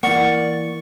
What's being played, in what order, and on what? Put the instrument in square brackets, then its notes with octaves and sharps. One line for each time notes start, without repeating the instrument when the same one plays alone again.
[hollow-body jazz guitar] E3 A#3 [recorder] D5 [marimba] F#5 [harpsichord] C#6